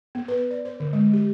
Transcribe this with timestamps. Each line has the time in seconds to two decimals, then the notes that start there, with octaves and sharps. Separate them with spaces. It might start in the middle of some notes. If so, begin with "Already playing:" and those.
0.15 B3
0.28 B4
0.51 D5
0.65 C5
0.80 D3
0.93 G#3
1.13 G4